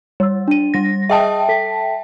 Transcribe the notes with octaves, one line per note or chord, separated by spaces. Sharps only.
G3 C#5 E6
D4 D#7
G3 A#6
G#4 D#5 E5 G5 A5 D#6
A4 B6